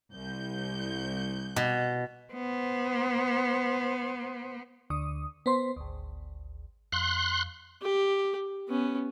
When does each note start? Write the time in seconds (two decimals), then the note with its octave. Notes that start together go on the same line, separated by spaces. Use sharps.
0.14 C2 G6
1.56 B2
2.34 B3 C5
4.90 D2 D3 D#6
5.46 B3 C5 C6
5.76 G#1 D2
6.92 F2 C6 F#6
7.82 G4
8.68 B3 C#4